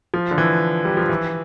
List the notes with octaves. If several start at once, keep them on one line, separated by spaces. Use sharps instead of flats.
F3
D3
E3
G3
F3
E3